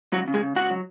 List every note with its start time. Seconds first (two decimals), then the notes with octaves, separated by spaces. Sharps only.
0.12 C#2 F#3 F#4
0.28 C#3
0.34 G#3 G#4
0.41 C#3
0.56 C#2 F#4 F#5
0.70 F#3